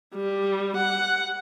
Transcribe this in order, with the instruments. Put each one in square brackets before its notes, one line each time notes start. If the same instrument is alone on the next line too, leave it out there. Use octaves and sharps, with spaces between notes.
[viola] G3
F#5